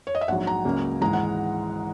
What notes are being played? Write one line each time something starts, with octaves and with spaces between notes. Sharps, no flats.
C#5
D#5
E5
A#1 G#2 F#3 F#5
A#5
C#2 C#3 F#3 A#3
G#1 G#2 E3 G#3 A#5
F#5